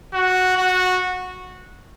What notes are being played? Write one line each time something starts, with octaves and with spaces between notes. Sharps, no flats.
F#4
F#4